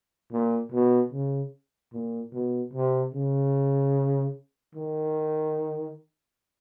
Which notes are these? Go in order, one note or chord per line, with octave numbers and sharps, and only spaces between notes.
A#2
B2
C#3
A#2
B2
C3
C#3
D#3